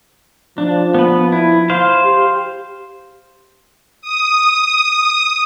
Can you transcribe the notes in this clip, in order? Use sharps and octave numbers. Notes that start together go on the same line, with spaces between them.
F3 D4
B3 B4
E4
C5 F5
G4
D#6